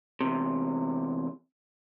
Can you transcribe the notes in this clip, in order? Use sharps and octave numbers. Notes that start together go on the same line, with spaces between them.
E2 C3